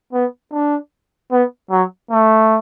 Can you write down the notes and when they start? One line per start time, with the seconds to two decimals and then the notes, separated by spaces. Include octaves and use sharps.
0.13 B3
0.52 D4
1.31 B3
1.71 F#3
2.11 A3